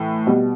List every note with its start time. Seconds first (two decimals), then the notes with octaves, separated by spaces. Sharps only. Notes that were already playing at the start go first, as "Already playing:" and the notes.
Already playing: A2 E3
0.27 B2 G3